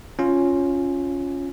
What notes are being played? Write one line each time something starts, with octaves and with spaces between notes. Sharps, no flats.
C#4 F4